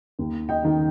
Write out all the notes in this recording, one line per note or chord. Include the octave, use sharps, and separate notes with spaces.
D#2
D#5 G5
D#3